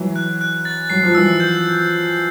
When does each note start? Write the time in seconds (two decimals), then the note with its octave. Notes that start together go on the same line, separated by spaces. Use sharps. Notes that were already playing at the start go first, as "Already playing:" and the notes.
Already playing: E3 F#3
0.16 F#6
0.41 F#6
0.65 A6
0.90 F#3 C7
1.03 F3
1.15 E3 F#3 E6
1.40 G6